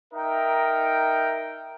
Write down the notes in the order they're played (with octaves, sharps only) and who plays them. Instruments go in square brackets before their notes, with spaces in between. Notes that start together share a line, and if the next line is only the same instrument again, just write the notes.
[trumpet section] D#4 A#4 E5 G5